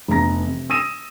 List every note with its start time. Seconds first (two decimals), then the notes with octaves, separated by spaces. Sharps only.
0.08 F1 B3 D4 A#5 A#6
0.47 C3
0.70 D#6 E6 A#6 D#7 E7